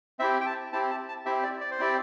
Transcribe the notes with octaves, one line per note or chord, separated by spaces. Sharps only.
C4 E4 G4 E5
G5
A5
C4 E4 G4 A5
A5
A5
C4 E4 G4 E5
D5
D5
C5
C4 E4 G4 D5